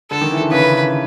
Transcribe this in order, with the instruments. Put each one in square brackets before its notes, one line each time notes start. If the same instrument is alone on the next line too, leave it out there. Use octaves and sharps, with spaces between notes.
[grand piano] D3 [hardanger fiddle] A4
[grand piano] D#3
E3
D3
[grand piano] C#3 [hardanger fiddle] B4